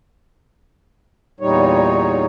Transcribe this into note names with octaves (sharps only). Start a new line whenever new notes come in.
E2 A#2 G3 D#4 C#5